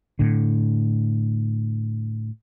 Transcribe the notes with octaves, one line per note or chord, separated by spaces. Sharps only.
A2 D3